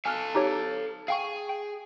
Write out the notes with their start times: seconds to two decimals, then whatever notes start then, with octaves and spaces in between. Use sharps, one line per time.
0.06 A4 F5 G#5 F6 F#6
0.35 D#4 G4 C#5
1.08 G#4 F5 G5 C#6
1.49 G5